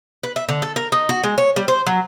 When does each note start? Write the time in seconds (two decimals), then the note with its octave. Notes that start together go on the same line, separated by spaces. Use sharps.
0.23 B4
0.36 E5
0.49 D3
0.62 A4
0.76 A#4
0.92 D#4
1.09 F#4
1.24 G#3
1.38 C#5
1.56 G3
1.68 C5
1.87 F#3